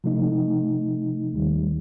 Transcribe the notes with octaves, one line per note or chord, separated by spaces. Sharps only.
C3 F3 A3 D#4
D#2 D#3 G3